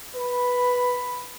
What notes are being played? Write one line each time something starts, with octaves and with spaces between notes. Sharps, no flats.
B4 B5